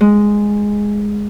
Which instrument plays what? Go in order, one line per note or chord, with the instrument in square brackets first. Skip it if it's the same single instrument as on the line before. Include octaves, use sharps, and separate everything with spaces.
[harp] G#3